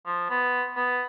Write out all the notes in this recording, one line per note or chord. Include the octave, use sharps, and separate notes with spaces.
F3
B3
B3